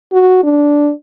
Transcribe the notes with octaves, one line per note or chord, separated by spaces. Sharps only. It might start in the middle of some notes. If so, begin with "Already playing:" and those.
F#4
D4